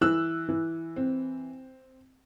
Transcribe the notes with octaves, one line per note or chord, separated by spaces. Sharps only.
E3 E6 F#6
E3
C4